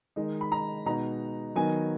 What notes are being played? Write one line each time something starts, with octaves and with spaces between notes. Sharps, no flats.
D#3 G#3 D#4
B5
A#5
B2 G#3 B3 D#4 A#5
D#3 F#3 B3 D#4 G#5